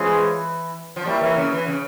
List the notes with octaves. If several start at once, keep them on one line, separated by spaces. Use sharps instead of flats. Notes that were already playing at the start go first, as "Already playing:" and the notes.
Already playing: E3 G#3 C#4 F4 G#4 C5
F3
G3 A#3 E4 A#4 C#5 E5
E3
C#3
E3
C#3